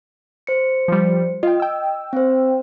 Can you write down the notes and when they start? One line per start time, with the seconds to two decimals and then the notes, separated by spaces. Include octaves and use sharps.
0.47 C5 C#7
0.88 F3 G3
1.43 F4 D#5 G5
1.60 G5 E6
2.13 C4 C5